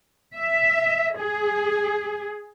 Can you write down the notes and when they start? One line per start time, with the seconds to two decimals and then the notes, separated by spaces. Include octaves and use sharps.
0.36 E5
1.19 G#4